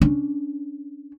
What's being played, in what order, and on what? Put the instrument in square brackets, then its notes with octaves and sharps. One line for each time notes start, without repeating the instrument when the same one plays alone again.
[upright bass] C#4 D4